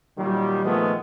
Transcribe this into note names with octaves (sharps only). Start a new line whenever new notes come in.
A#2 D#3 F#3 G3
A#2 D#3 F3 G#3 A3 B3